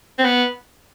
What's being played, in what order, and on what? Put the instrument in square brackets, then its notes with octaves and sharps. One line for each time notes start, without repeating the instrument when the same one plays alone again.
[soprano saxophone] C4
B3